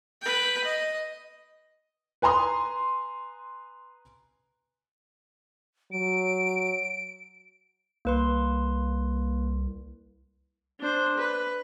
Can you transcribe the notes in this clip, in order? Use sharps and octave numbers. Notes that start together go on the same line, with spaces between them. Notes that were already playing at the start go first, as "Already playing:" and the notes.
B4 G5
D#5
B4 G#5 A#5 C6 D#6
F#3 D7
C2 A#3 B4 C6
D4 C5
B4